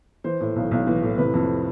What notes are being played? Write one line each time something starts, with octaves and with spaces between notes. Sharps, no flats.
E3 C5
A2
B1
B1
E3
A2
C3 B4
F2